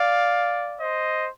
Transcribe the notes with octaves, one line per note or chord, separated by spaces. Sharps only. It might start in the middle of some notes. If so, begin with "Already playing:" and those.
Already playing: D5 F5
C5 D#5